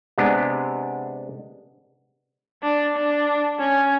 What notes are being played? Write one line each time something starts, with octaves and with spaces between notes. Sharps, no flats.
C3 G#3 B3 D4
D4
D4
C#4